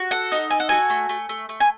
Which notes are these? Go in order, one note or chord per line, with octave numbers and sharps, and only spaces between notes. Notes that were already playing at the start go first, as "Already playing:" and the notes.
Already playing: F#4
A4 F#5
D#4
A4 G#5
F#5
F#4 G#5
A3
A3
A3
A3
G#5